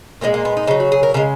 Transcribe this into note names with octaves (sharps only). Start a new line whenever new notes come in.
A#2 F3 G#3 A#3
A#3
B3
D#4
C#3 F#3 D#4
F#4
G#4
A#4
C#3 G#3 A#4